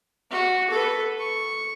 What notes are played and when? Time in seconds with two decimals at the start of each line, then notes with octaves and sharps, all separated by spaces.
0.31 F#4
0.70 A4 B4
1.19 C#6